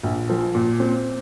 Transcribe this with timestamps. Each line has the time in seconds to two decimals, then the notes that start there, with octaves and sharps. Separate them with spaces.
0.03 A#1
0.29 F3
0.55 A#2
0.80 C4